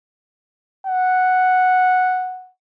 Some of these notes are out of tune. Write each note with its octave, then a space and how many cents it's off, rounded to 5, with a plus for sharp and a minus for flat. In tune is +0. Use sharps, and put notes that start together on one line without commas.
F#5 -5